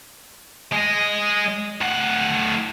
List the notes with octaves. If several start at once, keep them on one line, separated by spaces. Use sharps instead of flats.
G#3 D#5
A2 F#5